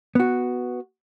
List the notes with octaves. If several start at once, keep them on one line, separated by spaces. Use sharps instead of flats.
B3 F#4